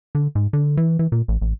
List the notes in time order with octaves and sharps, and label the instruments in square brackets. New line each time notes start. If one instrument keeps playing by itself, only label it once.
[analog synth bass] D3
G#2
D3
E3
E3
A#2
A1
A1